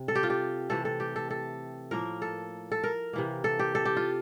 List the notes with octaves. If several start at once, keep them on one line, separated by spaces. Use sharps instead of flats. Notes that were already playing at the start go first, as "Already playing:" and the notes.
Already playing: C3
A4
G4
F4
G4
C3 E3 A3 A4
A4
G4
A4
A4
A2 F3 A#3 A#4
A4
A4
A#4
C3 E3 A#3
A4
G4
A4
G4
F4